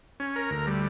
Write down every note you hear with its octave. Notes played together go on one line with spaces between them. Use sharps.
C#4
A#4
D2
G3